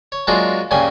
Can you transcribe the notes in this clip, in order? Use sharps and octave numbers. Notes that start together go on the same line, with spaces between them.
C#5
F#3 G#3 A#3 D4 F4 G#4
G2 C#3 A#3 G#5